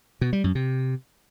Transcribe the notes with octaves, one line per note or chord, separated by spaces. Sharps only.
B2
G3
F#2
C3